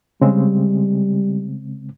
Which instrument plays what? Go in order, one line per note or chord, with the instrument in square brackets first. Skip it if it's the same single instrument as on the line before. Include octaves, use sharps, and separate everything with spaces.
[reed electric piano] C#3 G#3 C4 [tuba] G3